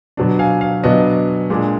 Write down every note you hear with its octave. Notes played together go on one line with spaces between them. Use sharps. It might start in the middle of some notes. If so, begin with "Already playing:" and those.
B2 F#3 B3 D4
F5 G#5
F5
B2 F#3 B3 D4 D#5
A#2 G#3 D4